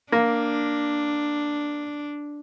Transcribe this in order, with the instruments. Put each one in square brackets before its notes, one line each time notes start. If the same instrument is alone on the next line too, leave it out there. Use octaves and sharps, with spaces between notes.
[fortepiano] A#3 [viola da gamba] D4